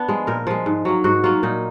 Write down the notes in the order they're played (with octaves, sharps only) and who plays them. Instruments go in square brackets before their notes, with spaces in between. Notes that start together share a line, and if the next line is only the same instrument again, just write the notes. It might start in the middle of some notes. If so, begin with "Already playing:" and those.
Already playing: [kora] B3 D4
F3 G#3
A#2 A#4
F3 G#3
G#2
F#3 A#3
G#2 F#4
F#3 A#3 F4
A#2 D#4